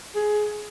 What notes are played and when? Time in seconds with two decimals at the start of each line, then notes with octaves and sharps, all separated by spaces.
0.15 G#4